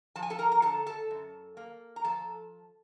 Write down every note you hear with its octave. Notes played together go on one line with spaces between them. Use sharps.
F3 A5
G#5
A4 A5
A#4 A#5
A#5
D3 A4 A5
A4 A5
F#2
A#3
A#5
F3 A4 A5